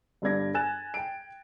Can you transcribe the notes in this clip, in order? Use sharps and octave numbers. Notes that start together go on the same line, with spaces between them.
G1 G2 D5 G#6 A#6
G#5 F#6 A6 E7
G5 D7